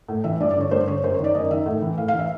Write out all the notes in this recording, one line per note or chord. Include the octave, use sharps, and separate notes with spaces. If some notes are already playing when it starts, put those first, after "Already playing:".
A2
E3 E5
G2 D5
D5
D3 C#5
G2 C5
D3 C#5
F#2 C5
C#5
D#3 D5
F#2 D#5
D#3 E5
A2
E3
A2 F5
F5
E3
E5